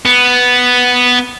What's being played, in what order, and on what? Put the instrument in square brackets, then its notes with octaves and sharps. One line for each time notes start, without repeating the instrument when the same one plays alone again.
[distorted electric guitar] B3